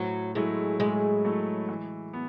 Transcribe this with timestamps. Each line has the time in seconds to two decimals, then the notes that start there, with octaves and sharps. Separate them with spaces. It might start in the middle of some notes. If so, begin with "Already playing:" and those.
Already playing: A2 F#3
0.35 F#3 G#3 A3 E4 A4
0.80 A2 G#3
1.25 F#3 A3 E4 A4
1.69 E3
2.13 B3